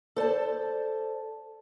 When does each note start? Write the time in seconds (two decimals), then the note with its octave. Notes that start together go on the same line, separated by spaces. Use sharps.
0.16 A4 C5 D5 A5